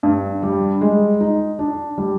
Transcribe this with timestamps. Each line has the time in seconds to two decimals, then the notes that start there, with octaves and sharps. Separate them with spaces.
0.03 G2
0.43 G3
0.81 G#3
1.20 D#4
1.59 D4
1.98 G3